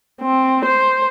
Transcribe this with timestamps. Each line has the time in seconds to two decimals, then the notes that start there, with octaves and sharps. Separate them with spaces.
0.22 C4
0.65 C5